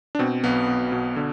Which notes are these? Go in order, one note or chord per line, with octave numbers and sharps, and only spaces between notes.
D4
B2 C4
B1 B3
B2
B2
D3